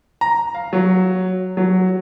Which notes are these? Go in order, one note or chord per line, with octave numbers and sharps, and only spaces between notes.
A#5
F5
F#3
F#3